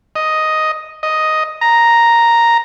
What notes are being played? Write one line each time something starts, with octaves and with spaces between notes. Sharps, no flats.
D#5
D#5
A#5